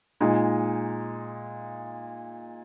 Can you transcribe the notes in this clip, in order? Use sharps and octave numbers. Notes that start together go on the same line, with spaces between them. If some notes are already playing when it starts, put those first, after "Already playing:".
A#2 G#3 D#4